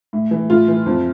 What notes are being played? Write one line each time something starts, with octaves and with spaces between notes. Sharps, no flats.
A2
E3
A2 F4
E3
F2